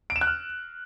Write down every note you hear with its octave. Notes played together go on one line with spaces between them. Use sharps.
D7
E7
F#6
F6